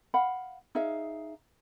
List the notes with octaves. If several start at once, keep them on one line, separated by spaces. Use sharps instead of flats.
F5 F#5 B5
D#4 G#4 E5 F5